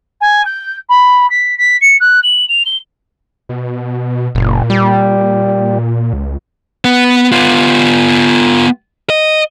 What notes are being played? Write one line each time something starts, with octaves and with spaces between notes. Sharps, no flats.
G#5
G6
B5
B6
B6
C#7
F#6
F#7
F7
G7
B2
F#1 A#2
G3
C#2
B3
B3 F4
D#5